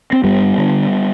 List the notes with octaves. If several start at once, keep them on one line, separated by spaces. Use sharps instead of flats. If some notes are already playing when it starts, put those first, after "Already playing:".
C4
G2 G3 B3
D3